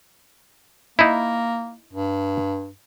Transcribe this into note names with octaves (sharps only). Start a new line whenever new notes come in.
A#3 D#4 E4
G2